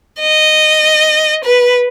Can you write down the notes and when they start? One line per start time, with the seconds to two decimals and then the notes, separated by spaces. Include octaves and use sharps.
0.20 D#5
1.44 B4